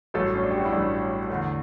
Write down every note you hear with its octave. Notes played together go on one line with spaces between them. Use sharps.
A1 G2 F#3 A3 A4
C#4
D4
G4
F#4
E4
A1 G2 F#3 A3 D4
E2 D3 A3